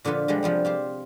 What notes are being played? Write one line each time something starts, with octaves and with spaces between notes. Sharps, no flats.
A#2 D3 F3 F4 B4
D3 F3 G3 G#3
C3 F3 G3 B3
F4 G4 C5